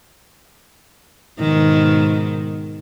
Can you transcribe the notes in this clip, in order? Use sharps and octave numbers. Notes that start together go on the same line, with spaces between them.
G#2 B2 D#3